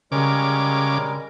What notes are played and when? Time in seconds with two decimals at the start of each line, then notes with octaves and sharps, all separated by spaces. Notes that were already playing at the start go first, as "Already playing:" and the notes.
0.12 C#3 G3 G#3 A#4 D6